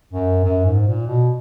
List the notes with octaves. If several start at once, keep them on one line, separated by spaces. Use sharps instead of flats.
F#2
F#2
G#2
A#2
B2